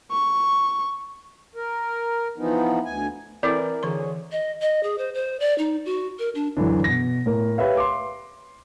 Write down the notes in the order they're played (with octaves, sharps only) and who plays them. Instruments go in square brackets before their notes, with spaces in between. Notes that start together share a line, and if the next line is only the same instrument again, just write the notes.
[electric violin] C#6
[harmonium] A#4
E3 F3 B3 D#4
D2 G#5
[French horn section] E3 [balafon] C4 E4 A4 [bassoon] A#4 [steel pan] D5
[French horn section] D2 G#4 C#5 [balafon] D3 E3 C6
[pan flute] D#5
D#5
G#4
C5
C5
D5
D#4
F#4
A#4
D4
[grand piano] F#2 D3 E3 D4
B2 A#6
A2 A#4
G4 B4 C#5 E5 F5
C6 D6